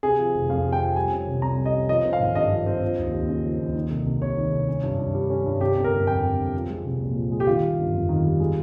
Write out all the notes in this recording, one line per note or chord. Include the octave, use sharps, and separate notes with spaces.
C3 G#4
F3
F1
F2 F5
C3
G5
F3
G3 G#5
C#4
C2
C3 A#5
G3
D#5
C#4
F3 D#5
C4
F5
G#1
G2 D#5
F3
C4
F3
D#2
D#2
C#3
F3
D#2
D#3
C2
C2
C3 C#5
D#3
C2
C#4
G2
G2
G3
C#4
G2
C3 G4
G1
A#4
G1
F2 G5
C3
G1
F3
G#3
C2
A#2
F3
G#3
G4
D#3 F4
G3
G1
F2
D#3
G3
G#3